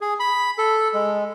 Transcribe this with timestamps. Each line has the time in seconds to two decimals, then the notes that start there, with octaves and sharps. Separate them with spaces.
0.01 G#4
0.20 B5
0.58 A4
0.94 G#3